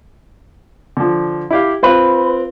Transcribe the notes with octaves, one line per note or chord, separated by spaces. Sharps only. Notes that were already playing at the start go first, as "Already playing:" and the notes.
D3 F3
E4 G4 F5
C4 F4 B4